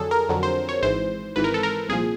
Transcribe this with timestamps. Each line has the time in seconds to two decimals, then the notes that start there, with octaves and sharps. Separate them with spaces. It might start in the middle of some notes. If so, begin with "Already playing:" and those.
Already playing: F2 D3 F#3 G#4 A4
0.11 A#4
0.28 F2 D3 F#3
0.43 C5
0.69 C#5
0.82 G#1 G#2 E3 C5
1.36 G#1 G#2 E3 B4
1.44 A#4
1.54 A4
1.63 A#4
1.88 C2 A#2 F3 G#4